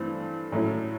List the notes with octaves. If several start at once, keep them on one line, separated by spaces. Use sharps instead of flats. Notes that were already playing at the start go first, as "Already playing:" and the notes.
Already playing: G2 E3 A3 C4
A2 F#3 A3 C#4 E4